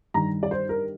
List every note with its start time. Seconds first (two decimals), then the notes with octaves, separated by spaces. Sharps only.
0.14 G2 D#3 G3 A#5
0.43 D5
0.51 C5
0.69 A#4